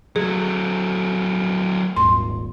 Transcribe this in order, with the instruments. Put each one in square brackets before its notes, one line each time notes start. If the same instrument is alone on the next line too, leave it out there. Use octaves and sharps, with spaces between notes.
[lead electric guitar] F#3 A3 [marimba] G#4
[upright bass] D#1 G#1 [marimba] C6